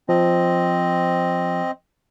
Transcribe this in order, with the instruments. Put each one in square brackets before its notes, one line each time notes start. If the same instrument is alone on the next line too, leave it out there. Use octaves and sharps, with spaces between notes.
[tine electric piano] F3 [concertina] C4 D#5